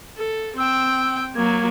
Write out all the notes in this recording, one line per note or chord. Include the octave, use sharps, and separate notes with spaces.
A4
C4 G5 E6
F#3 A#3 G#6